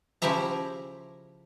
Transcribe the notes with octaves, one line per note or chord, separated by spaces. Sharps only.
C#3 F3 E4 G4 E5 A#5